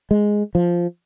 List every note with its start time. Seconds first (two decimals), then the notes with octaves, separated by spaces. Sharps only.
0.11 G#3
0.55 F3